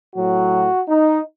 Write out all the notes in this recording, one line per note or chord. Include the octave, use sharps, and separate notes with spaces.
A2 F#3 F#4
D#4